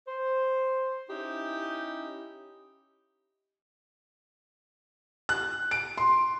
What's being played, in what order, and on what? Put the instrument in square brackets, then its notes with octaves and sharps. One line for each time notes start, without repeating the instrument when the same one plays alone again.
[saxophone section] C5
C#4 D#4 E4 G4
[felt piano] F#6
D7
C6